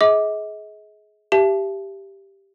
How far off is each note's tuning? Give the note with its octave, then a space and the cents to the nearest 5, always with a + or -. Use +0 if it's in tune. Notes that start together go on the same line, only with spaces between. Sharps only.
G#4 +20 D#5 +40 D6 +0
G4 +0 E5 +35 A5 -25